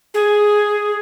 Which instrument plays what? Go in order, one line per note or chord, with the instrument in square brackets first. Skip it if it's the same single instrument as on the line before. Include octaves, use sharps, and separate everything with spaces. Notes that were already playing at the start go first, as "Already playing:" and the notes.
[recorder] G#4